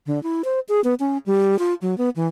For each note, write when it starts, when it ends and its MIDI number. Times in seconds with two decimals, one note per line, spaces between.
0.07 0.22 50
0.23 0.42 64
0.45 0.60 72
0.69 0.81 68
0.84 0.94 59
1.00 1.18 61
1.26 1.58 55
1.59 1.74 65
1.82 1.97 54
1.98 2.10 59
2.16 2.27 52